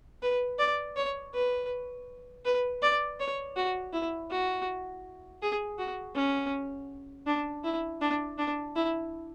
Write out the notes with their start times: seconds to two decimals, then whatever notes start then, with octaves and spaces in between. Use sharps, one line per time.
0.22 B4
0.59 D5
0.96 C#5
1.34 B4
2.45 B4
2.82 D5
3.20 C#5
3.56 F#4
3.93 E4
4.31 F#4
5.42 G#4
5.79 F#4
6.15 C#4
7.26 D4
7.64 E4
8.01 D4
8.38 D4
8.76 E4